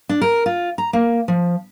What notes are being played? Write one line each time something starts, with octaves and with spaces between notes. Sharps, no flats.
D4
A#4
F4
A#5
A#3
F3